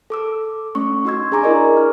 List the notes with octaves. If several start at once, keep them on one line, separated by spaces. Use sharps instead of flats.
A4 D6 E6
A3 C#4 C#6
D#4 F#4 C6 E6 G#6
D4 G#4 G#5 A#5 C#6 D6
E4 F#4 G#4 A#4 D5 D#5
F6